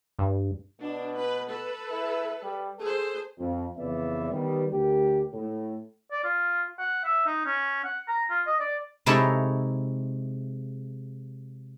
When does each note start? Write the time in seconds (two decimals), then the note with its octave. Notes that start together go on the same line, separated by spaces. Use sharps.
0.19 G2
0.81 B2 D4
1.18 B4
1.49 A4 B4
1.92 E4
2.43 G3
2.79 G#4 A4 C5
3.38 F2
3.78 F2 C#3 E3 B3 D5 E5
4.31 D#3 G3 B3
4.71 D2 G4 A#4
5.33 A2
6.11 D5
6.24 F4
6.79 F#5
7.04 E5
7.26 D#4
7.46 C#4
7.84 F#5
8.08 A#5
8.30 F4
8.47 D#5
8.60 D5
9.06 C3 G#3 D#4 E4 A4 C#5